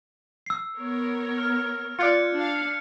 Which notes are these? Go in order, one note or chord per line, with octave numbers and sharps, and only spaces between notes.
E6 C7
B3 A#4 C#5
F6
F4 D5 F#6 G#6 C#7
D4 F5